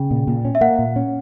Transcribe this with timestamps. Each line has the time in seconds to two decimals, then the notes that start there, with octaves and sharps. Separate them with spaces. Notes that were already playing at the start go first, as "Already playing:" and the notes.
Already playing: C#3 G5
0.11 A#2
0.27 A#2
0.45 C#4
0.55 E5
0.61 A#3 F#5
0.79 A#2
0.96 C#4